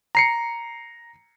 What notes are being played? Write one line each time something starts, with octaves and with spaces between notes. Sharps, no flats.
A#5 C7 C#7